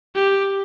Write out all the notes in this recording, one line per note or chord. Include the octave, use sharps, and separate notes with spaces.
G4